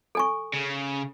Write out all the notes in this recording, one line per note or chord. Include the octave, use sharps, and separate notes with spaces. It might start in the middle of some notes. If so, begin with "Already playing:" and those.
A4 G#5 C#6
C#3